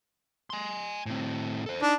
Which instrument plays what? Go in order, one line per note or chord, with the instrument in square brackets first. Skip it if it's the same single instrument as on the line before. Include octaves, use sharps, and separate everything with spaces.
[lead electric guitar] G#5 C6
A2 C4
A4 C5
[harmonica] D4 [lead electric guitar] D#4